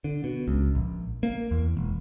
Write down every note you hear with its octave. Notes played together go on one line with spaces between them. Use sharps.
D3
B2
C#2
A#1
A#3
E2
E1